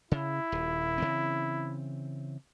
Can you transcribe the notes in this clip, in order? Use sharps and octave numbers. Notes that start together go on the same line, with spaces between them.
C#3 E4
D#1
C#3 E3 C4